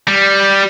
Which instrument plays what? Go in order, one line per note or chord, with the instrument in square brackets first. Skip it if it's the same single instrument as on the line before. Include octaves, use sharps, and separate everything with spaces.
[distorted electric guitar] G3